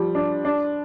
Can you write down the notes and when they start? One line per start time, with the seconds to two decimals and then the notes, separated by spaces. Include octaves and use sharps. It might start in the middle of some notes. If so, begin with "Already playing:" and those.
Already playing: F3 G3
0.15 D4
0.45 D4